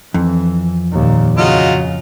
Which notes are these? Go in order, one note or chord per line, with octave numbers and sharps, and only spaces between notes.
F2 E3
D#2 A#2
C#3 F#3 F4 D#5